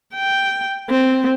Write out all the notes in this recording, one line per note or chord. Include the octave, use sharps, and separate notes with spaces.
G5
C4